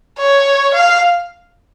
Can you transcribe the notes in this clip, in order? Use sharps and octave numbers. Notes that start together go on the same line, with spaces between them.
C#5
F5